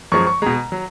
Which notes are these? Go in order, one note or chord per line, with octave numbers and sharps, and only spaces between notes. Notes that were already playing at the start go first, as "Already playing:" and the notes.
F#2 F3 G#3 C#6
C#6
B2 G#3 A#5
F#3